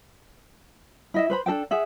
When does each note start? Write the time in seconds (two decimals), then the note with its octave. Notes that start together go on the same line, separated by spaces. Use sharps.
1.14 E4 D#5 E5
1.30 B4 C5 B5
1.46 D4 A4 C5 G5
1.71 G#4 E5 F#5